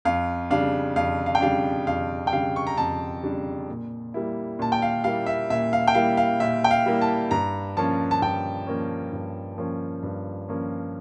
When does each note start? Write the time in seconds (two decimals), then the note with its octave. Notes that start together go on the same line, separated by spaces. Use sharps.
0.05 F2 F5
0.50 C#3 G3 D4 F5
0.96 F2 F5
1.26 F5
1.35 G5
1.41 C#3 G3 D4 F5
1.87 F2 F5
2.27 G5
2.33 C#3 G3 D4 F5
2.56 C#6
2.67 A#5
2.77 F2 A5
3.23 C#3 G3 D4
3.68 A#2
4.14 G3 A#3 E4
4.59 A#2 A5
4.72 G5
4.82 F5
5.04 G3 A#3 E4 F5
5.26 E5
5.50 A#2 E5
5.73 F5
5.88 G5
5.95 G3 A#3 E4 F5
6.17 F5
6.40 A#2 E5
6.64 G5
6.71 F5
6.86 G3 A#3 E4
7.01 A5
7.31 G2 A#5
7.77 F3 A#3 C#4 A5
8.11 A5
8.22 G2 G5
8.67 F3 A#3 C#4
9.13 G2
9.58 F3 A#3 C#4
10.03 G2
10.49 F3 A#3 C#4